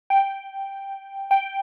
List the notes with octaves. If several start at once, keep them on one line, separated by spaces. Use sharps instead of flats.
G5
G5